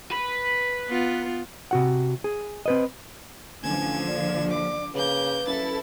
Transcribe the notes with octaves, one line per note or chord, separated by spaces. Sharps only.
B4
B3 F4
C3 F#4 F#5
G#4
C4 B4 D#5
A1 D3 F3 G#5 G#6 E7
A#1 D5
D6
C#3 A#3 B4 G6
F#2 E4 A4 A6